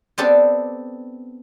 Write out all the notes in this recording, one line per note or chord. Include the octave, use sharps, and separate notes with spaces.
B3 C4 D4 G4 A4